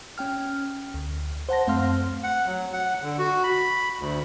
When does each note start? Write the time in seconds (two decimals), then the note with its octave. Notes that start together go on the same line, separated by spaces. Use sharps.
0.18 C#4 G5 F6
0.94 D2
1.49 C5 F#5 A5 A#6
1.67 F#2 A3 C4 F5 C6 F6
2.24 F#5
2.46 F#3
2.73 F#5
3.02 D3
3.18 F#4
3.44 B5
4.00 D2